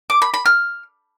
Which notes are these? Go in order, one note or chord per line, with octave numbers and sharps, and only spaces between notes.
D6
B5
B5
F6